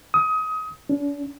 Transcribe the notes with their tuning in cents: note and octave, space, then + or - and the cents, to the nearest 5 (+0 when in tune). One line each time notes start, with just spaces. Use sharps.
D#6 +25
D4 -45